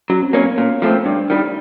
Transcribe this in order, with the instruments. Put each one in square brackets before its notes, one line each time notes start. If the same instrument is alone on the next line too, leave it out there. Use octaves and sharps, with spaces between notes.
[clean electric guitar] F#3 [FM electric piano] C#4
[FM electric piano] C4
[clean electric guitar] A#3 C#4 [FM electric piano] B3
[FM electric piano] C#4
[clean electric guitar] A#2
F3 A3 C4
[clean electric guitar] G2 [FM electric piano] D4
[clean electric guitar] D#3 G3